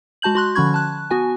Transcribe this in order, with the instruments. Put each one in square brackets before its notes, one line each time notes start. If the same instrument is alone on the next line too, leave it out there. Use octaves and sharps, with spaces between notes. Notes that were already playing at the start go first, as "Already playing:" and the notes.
[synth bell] G#3 F#4 A5 G6 F#7
F#4 C6 F#6
D3 F3 C#4 B5 C#6 G#6
A5 F#6
B3 F#4 G#5